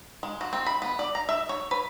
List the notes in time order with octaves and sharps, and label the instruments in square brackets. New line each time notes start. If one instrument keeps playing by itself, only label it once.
[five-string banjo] G#3
F#4
C4
B5
B3
D5
A#5
E5
C#5
B4